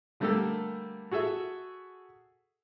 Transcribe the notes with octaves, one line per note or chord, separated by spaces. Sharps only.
D3 G3 A3 A#3 G4 A4
F#4 G#4 A4 E5